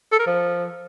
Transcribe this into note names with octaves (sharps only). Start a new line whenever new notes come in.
A4
A#4
F3